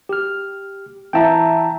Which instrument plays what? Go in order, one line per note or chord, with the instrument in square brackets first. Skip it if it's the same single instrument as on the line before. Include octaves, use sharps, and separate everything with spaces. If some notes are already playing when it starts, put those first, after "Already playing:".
[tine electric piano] G4 F6
[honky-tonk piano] E3 E5 [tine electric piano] G5 A5 A#5